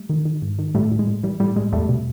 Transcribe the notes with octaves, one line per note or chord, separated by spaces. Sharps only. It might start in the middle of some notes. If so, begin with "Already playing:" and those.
Already playing: G3 A3
D#3
D#3
G#2
D#3
A2 G3 A3
A2
G#3
A2
E3 G3
A2 G3
A2 G#3
E2 G3 A3
B2